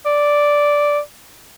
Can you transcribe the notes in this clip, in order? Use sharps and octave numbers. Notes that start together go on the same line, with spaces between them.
D5